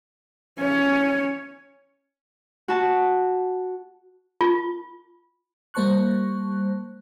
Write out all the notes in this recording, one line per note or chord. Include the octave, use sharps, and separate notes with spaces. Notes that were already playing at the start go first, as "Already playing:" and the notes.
C#4 C#5
F#4 A5
F4
G3 A#3 C5 A5 C#6 F#6